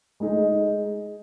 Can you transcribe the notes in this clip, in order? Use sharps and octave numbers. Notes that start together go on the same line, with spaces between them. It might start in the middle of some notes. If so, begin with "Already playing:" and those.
G#3 D#4 G#4